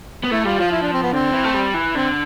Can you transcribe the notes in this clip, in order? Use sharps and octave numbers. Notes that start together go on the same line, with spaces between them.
B3
A3 E4
G3 F4
F3 F4
E4
D4
C4
B3
D3 C4
E3
A3
G3
E3
D3 C4